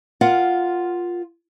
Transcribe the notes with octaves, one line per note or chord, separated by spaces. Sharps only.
F4 A#4 F5 F#5